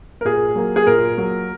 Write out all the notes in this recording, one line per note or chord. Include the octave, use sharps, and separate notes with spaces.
A#4
A#2 G#4
F#3 A#3
G#4
A#2 A#4
F#3 A#3